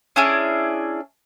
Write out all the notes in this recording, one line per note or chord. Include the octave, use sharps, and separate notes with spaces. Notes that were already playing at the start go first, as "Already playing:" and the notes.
C#4 D4 E4 G#4